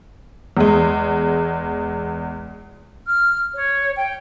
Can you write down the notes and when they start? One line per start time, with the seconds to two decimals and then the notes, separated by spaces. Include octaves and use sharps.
0.57 E2 G#3
3.07 F6
3.55 C#5
3.95 G5